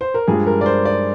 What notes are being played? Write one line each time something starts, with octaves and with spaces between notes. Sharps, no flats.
C5
A#4
G2 F3 G#3 G#4
A#4
D5
C5
D5